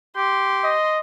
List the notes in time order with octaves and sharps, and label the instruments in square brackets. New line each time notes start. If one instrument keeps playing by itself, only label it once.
[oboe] G4 [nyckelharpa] C6
[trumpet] D#5